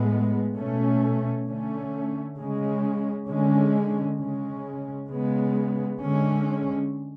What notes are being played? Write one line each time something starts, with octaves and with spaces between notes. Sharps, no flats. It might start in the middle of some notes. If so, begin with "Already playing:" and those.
Already playing: A2 G#3 B3
B2 A3 C#4
D3 A3 C#4
C#3 G#3 C#4
D3 G#3 C#4
C#3 G#3 C#4
C#3 G#3 B3
D3 G#3 C#4